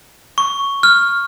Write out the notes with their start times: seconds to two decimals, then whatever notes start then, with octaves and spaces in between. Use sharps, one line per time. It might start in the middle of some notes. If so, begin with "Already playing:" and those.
0.38 C#6
0.83 F6